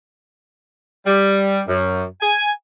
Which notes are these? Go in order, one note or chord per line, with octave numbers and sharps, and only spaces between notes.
G3
F#2
G#5